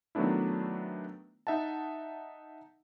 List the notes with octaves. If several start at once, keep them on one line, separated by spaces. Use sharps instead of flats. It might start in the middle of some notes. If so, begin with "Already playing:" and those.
D#3 F#3 A3 B3 D4 E4
D#4 E5 F#5 A5